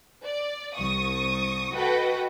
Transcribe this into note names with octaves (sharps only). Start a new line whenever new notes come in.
D5
C2 C#6 D#6
F#4 A4 B4 D#5 F#5 G5